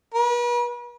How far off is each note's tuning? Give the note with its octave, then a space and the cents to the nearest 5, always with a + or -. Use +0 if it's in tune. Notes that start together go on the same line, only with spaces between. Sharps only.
B4 -40